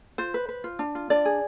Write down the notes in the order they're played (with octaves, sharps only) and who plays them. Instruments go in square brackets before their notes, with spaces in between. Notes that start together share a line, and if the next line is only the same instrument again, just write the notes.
[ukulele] F4 C5
B4
B4
F4
D4
F4
D4 D5
G#4